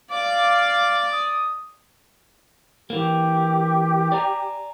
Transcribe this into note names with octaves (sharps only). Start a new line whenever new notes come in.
D5 F5 D6
D#6
E3 A#3 G4
D5 G#5 A#5